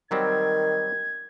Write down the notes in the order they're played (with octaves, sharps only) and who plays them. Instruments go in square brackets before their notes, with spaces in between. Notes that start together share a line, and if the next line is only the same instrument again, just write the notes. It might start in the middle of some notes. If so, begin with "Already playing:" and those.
[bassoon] D#3 [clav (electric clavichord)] F#3 G3 C4 [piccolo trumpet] G#6